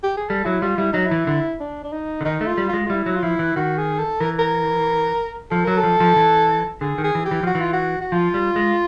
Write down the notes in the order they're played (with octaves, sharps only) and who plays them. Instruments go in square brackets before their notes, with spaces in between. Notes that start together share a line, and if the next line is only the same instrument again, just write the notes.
[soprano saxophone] G4
G#4
[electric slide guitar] G3 [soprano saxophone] A4
[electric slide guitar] F#3 [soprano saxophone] E4
[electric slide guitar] G3 [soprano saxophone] F4
[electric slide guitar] G3 [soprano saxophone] E4
[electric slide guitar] F#3 [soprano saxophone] D#4
[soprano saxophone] E4
[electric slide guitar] E3
D3
[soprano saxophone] D4
D4
D#4
[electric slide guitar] D3
[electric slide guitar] D#3 [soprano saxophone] D#4
[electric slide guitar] A3
[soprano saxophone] F4
[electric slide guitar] G3
[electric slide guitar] G#3 [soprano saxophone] F4
[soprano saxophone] F4
[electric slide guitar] G3 [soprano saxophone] E4
[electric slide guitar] F#3
[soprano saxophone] F4
[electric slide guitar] F3 [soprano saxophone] E4
[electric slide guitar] E3
[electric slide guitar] D#3 [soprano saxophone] F#4
[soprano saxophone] G#4
A4
[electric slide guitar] E3 [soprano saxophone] A#4
[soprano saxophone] A#4
[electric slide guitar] F3 [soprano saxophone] A4
[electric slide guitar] F#3 [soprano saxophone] A#4
[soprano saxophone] A4
[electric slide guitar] F3
F3
E3
[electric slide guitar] D3 [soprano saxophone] G#4
[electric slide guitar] D#3
[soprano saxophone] G#4
[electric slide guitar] E3
[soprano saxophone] G4
[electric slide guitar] E3
[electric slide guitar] F3 [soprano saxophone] F#4
[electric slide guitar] E3
[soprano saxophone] F4
F#4
F#4
[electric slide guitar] F3 [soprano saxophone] F4
[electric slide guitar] G3
G#3